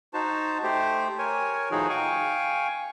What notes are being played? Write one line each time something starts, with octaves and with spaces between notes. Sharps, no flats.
D#4 F#4 C5 A5
A3 G4 C5
A#4 C#5 G#5
A2 D#3 F3 D#4 F#4 G#4
F5 G5 G#5 C#6